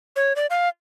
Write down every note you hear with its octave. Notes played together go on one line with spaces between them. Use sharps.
C#5
D5
F5